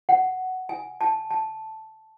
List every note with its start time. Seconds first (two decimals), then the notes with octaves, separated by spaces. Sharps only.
0.09 F#5
0.69 G#5
1.01 A5
1.30 A5